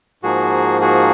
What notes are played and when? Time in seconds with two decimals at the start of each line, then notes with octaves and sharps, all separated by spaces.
0.23 G#2 F3 A#3 F#4 G#4
0.81 F#4 G#4